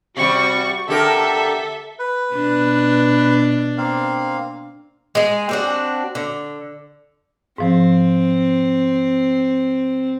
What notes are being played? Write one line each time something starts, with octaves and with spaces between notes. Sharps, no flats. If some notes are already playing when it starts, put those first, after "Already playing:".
C3 G3 F#4 C#6
D3 G4 A4 A#4 E5
B4
B2 D4
A#3 C4 F5
G#3 G#4
C4 D4 F#4
D3
G#2 F3 C4